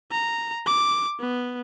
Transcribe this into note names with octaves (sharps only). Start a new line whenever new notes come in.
A#5
D6
B3